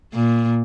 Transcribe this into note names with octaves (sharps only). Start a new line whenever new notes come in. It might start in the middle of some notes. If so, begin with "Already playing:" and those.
A#2